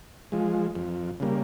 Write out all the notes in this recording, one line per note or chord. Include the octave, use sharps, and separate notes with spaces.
F3 G#3
F2
C#3 G3 A#3